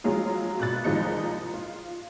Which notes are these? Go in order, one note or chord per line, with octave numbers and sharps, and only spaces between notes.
F3 F#3 G#3 F4 G#4
G1 B2 F#6 A6
C2 F3 G#3 D#4 C#7
F4